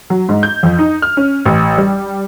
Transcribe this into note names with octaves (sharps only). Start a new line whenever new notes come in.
F#3
G#2
G6
F2
D#4
F6
C#4
A1
G3